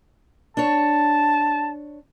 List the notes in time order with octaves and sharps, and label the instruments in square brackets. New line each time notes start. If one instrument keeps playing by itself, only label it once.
[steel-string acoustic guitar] D4 C#5 [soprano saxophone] A5